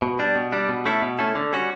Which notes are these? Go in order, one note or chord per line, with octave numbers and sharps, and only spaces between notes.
B2
G3 D4
B2
G3 D4
B2
A3 C#4 E4 A4
B2
A3 C#4 E4 A4
D3
G3 C#4 F#4